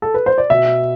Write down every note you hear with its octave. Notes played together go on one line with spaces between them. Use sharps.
A4
B4
C5
D5
B2 E5